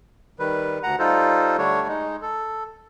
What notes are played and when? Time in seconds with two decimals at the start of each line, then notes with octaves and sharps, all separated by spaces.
0.39 D#3 G3 B4
0.83 D2 F#5 A#5
0.99 G3 D#4 F4 A4 C5
1.58 D3 G3 A3 D4 C#5
1.88 G#3 D#4
2.22 A4